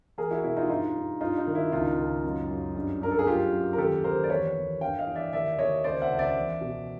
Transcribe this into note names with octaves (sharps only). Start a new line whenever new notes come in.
E2 G#4 A#4
E4 F#4
B2 E4
D#4 F4
G2 D#4 F4
G2
G2 D#4 F4
D#4
D#3
E4
C#2 D#4 F4
C#2
F#2
F#2
G2
G2 A#4
A4
G#4
F#2 F4 G4
F#2
A#4
D#2 G4 A4
D#2 A#4 C5
D5
E2 B4 C#5
E2
G2 F5 G5
D#5 F5
E3
D5 E5
D#2 D5 E5
D#2 C#5 D#5
C#2 C5 D5
E5 F#5
C#2
D5 E5
E2
B2